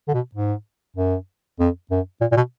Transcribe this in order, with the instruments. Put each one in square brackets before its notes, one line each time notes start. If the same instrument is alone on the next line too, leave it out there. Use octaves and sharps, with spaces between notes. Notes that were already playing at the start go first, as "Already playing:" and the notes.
[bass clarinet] D3
B2
G#2
F#2
F2
F#2
A#2
A#2
B2